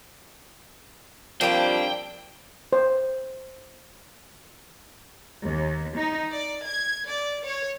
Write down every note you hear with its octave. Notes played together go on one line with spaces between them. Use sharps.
F3 G3 A#3 C4 D4 G4 G5
C5
D#2
D#4
D5
G#6
D5
C#5